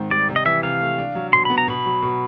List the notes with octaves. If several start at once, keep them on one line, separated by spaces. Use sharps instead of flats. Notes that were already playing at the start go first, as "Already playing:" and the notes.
Already playing: G#2 D#3 C4
G3 D5
C3
D#5
E3 E5
C3 F5
A3
D4
F#3
B2 C6
B3 B5
A#5
B2 B5
F#3
B2